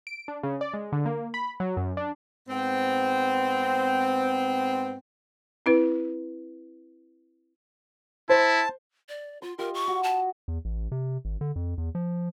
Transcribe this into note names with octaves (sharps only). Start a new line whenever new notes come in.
D7
D4
C#3
D5
G#3
D3
A#3
B5
F#3
F#2
D4
G#2 B3 C4
C4 E4 B4
E4 C5 A5
D5
F4 C6
F4 G4 A#4 D#5
C#6
F#4
A5
E2
A1
C3
G#1
D3
F2
E2
F3